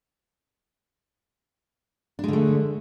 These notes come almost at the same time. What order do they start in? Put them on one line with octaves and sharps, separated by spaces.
D4 G#3 D3 A3